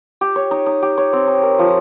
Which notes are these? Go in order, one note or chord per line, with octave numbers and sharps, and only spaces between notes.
G4
C#5
D#4
D#4
G4
C#5
C4
D#4
A#4
F3